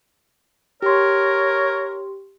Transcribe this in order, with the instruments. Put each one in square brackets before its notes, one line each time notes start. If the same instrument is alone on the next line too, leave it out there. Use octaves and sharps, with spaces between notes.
[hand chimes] G4 C6 [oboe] A#4 [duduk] C#5